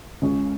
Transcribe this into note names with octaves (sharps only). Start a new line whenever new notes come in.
C#2 C#3 G#3 C#4